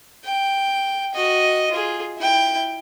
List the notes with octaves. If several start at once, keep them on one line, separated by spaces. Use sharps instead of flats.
G5
F#4 D#5
F4 G#4
E4 G5